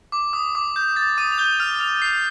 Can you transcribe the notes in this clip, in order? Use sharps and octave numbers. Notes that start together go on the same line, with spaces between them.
D6
D#6
D6
G6
A6
D#6 D#7
F7
G6 G7
F6 F7
F6 F7
C7